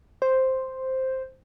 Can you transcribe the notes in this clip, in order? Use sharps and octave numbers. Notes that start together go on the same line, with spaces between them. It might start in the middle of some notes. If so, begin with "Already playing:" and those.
C5